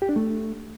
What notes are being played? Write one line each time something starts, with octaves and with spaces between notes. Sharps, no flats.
G4
D4
A3